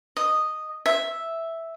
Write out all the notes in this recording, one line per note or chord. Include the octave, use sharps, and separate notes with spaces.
D#5
E5